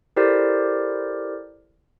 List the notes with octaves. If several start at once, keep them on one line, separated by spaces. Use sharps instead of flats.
E4 G4 A4 A#4 C5 D5